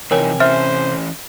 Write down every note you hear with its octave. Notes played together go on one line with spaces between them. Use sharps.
C3 E3 F3 D#4 A#4 C#5 G5 G#5
E3 C#4 C5 E5 F6